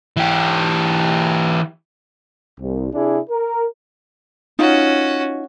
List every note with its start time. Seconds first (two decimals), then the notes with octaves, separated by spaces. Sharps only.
0.17 E3 G4
2.60 C2
2.93 C3 D4 E4 G#4
3.30 A#4
4.59 C#4 D#4 F4 F#4